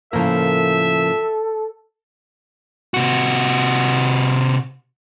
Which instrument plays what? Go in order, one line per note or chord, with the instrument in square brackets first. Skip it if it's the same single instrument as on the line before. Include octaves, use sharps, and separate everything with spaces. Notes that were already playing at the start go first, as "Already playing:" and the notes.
[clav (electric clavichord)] A2 A#3 [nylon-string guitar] C#3 F3 A#4 [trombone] A4 [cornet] E5
[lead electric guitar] C3 F#4